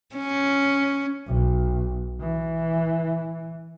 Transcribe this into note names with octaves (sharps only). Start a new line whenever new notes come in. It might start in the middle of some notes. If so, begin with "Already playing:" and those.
C#4
B1
E3